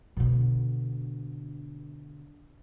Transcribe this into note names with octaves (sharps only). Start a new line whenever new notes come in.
B2 D3